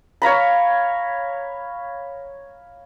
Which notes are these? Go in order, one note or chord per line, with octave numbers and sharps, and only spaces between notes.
C#5 F5 A#5 B5